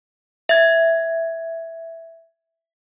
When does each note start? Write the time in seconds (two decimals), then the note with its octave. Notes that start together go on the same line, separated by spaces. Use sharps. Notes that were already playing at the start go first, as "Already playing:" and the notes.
0.49 E5 G#6